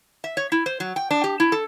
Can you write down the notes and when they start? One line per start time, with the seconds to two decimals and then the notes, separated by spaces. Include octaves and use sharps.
0.24 E5
0.37 C#5
0.52 E4
0.66 C5
0.80 F#3
0.96 G5
1.11 D4
1.24 G4
1.40 E4
1.52 A4